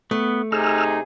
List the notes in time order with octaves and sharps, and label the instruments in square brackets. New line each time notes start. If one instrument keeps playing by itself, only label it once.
[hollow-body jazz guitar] A3 [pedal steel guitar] B3
[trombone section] C3 G#4 [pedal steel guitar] D#4 [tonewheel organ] E6 F6